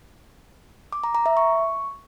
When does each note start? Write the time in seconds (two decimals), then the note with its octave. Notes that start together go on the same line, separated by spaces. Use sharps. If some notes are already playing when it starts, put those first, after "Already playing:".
0.93 D6
1.04 A#5
1.15 A#5
1.26 E5
1.37 C#6